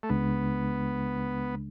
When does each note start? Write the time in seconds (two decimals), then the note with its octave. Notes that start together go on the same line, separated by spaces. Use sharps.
0.03 A3
0.09 C#2 C#3 G#3 B3 D4